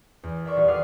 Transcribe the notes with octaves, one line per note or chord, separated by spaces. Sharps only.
E2
A#4 D5 E5 C6 C#6
D#1 B3 F4 A4
G#4 F5 G5 D6 F6